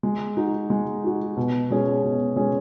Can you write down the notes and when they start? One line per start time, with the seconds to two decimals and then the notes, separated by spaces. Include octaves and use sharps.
0.03 G#3
0.37 D#4 F#4
0.70 G#3
1.04 D#4 F#4
1.37 B2
1.71 G#3 C#4 G#4
2.04 B2
2.36 G#3 C#4 G#4